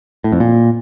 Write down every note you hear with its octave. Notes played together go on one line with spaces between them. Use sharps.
A2
F2
A#2